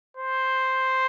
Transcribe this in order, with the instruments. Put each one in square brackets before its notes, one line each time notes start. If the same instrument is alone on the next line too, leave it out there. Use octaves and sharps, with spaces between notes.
[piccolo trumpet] C5